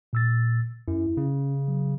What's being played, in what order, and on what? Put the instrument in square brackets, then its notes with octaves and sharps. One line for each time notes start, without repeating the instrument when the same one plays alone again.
[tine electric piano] A#2 E6 A6
[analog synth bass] F#2 [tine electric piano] E4
[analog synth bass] C#3 [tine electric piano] C#4
[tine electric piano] F#3